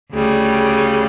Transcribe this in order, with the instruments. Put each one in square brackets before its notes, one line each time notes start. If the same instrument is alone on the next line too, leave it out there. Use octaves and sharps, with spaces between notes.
[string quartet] D2 C#3 G3